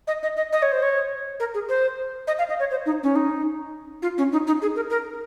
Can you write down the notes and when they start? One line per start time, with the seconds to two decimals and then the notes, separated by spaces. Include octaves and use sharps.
0.07 D#5
0.23 D#5
0.37 D#5
0.53 D#5
0.62 C#5
0.72 C5
0.83 C#5
1.40 A#4
1.54 G#4
1.69 C5
2.27 D#5
2.39 F5
2.49 D#5
2.60 C#5
2.71 C5
2.86 D#4
3.03 C#4
3.16 D#4
4.02 F4
4.18 C#4
4.32 D#4
4.47 D#4
4.62 G#4
4.76 A#4
4.90 A#4